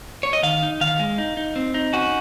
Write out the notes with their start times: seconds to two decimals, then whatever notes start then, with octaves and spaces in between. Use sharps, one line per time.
0.23 C#5
0.33 D#5
0.43 D#3 F5
0.63 D#4
0.81 D#3 F5
0.99 G#3
1.18 D#4
1.37 D#4
1.56 C4
1.74 D#4
1.93 C#4 F#4